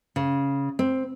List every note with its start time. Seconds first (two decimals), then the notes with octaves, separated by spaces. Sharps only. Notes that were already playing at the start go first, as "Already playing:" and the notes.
0.16 C#3
0.79 C4